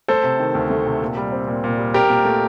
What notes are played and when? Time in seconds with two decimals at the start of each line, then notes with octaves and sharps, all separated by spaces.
0.08 A3 A4 C5
0.24 C3
0.40 D#3
0.55 D2
0.70 A3
0.86 C3
1.02 A#2
1.17 G3
1.32 C4
1.47 A#2
1.64 A#2
1.78 G3
1.94 C4 G4 A#4
2.10 A#2
2.25 A3